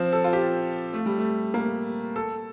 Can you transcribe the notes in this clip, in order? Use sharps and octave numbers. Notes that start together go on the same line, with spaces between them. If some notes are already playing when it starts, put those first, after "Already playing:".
Already playing: F3 C4
A4
F4
G4
A3
G3
A3
A#3
A4